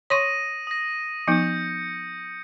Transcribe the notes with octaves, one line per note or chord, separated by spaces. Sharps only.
C#5 C6 C#6 D#6 A#6 D#7
D#6 A#6
F3 B3 D#4 G6 C#7